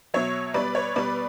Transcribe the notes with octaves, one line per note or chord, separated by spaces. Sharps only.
B2 F#3 C#5 E5
B2 G3 B4 D5
C#5
B2 G3 B4 D5